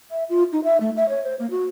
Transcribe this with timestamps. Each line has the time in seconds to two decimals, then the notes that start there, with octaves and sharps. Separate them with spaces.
0.11 E5
0.29 F4
0.53 D#4
0.64 E5
0.81 A3
0.96 E5
1.09 C#5
1.24 C5
1.39 A#3
1.51 F#4